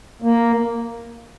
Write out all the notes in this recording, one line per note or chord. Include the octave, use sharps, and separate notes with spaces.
A#3